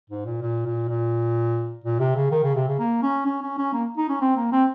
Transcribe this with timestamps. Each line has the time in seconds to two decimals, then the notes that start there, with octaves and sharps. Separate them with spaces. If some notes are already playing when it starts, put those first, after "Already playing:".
0.10 G#2
0.26 A#2
0.42 A#2
0.66 A#2
0.89 A#2
1.84 A#2
1.99 C3
2.15 C#3
2.31 D#3
2.43 C#3
2.55 C3
2.67 C#3
2.79 A#3
3.02 C#4
3.26 C#4
3.42 C#4
3.58 C#4
3.73 A#3
3.97 D#4
4.09 C#4
4.21 C4
4.36 A#3
4.52 C4